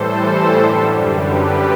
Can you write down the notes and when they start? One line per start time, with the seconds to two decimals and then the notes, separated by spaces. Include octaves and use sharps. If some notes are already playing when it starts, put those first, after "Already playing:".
Already playing: A2 E3 G3 A4 C5
0.59 F#2 D3 G3
1.08 G4 B4